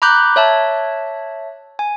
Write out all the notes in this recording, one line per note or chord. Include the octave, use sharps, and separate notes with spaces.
A#5 B5 D6 F#6 G6
C#5 E5 A5
G#5